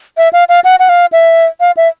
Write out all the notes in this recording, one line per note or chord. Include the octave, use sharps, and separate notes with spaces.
E5
F5
F5
F#5
F#5
F5
E5
F5
E5